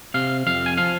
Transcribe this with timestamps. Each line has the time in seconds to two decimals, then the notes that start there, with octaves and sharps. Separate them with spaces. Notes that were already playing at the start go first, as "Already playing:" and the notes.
0.14 C3 F5
0.46 F2 F5
0.66 G#5
0.77 F3 F5